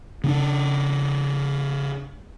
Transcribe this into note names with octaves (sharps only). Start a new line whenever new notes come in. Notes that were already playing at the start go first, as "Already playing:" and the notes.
C#3 C4 D4